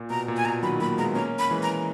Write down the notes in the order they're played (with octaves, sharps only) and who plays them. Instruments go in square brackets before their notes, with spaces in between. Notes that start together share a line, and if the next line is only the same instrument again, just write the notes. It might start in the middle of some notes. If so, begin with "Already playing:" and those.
Already playing: [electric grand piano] A#2
[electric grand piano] B2 [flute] A#5
[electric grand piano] A#2
[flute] G#5
[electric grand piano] B2 [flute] A#5
[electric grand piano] D#3 F#3 [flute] B5
[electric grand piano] F#3 A#3 [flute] B5
[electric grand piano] G#3 B3 [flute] A#5
[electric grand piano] A#3 C#4 [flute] A#5
[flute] B5
[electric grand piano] E3 G#3
[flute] A#5